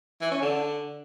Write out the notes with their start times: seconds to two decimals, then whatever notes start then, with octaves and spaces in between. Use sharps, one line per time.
0.21 E3
0.32 C#4
0.42 D3